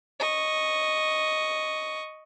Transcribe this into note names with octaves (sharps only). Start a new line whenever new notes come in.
D#5 C#6